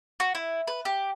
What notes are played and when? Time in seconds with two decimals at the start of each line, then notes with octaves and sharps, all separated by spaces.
0.20 F#4
0.35 E4
0.67 B4
0.85 G4